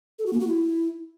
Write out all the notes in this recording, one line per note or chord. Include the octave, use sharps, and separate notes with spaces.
A4
F#4
A#3
F#4
E4